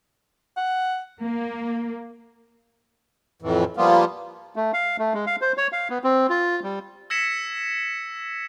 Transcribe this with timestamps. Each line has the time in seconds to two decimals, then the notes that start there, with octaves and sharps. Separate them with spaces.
0.57 F#5
1.22 A#3
3.42 F2 A2 E3
3.77 F3 G3 A#3 B3 F4
4.56 A3
4.73 F5
4.99 A3
5.14 G#3
5.27 F5
5.41 C5
5.57 C#5
5.72 F5
5.90 B3
6.04 C4
6.30 F4
6.63 G3
7.10 E6 G#6 A#6 B6 C#7 E7